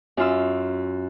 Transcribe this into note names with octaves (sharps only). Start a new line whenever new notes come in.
F#2 F4 E6